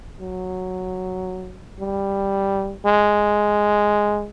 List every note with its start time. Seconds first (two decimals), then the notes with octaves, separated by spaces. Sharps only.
0.20 F#3
1.79 G3
2.85 G#3